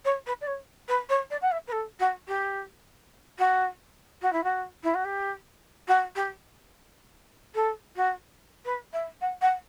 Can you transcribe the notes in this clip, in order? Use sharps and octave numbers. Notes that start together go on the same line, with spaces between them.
C#5
B4
D5
C#5
B4
C#5
D5
F#5
E5
B4
A4
F#4
G4
F#4
F#4
E4
F#4
E4
F#4
G4
F#4
G4
A4
F#4
B4
E5
F#5
F#5